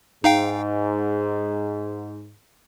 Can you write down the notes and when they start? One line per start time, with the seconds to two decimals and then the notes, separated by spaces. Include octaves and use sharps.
0.24 G#2 D#4 F5 G5